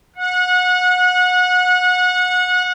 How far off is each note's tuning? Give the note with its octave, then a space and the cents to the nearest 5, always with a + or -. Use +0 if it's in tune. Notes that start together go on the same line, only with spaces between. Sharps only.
F#5 -30